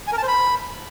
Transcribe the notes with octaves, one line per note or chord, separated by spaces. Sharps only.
G#5
A#4
A5
C5
B5